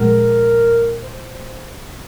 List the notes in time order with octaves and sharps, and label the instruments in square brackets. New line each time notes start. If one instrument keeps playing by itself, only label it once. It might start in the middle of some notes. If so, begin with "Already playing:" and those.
Already playing: [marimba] A#2 F3 G#3 [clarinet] A#4
[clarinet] C5